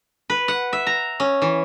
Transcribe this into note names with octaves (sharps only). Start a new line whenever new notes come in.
B4
F#5
E5
A#5
C#4
E3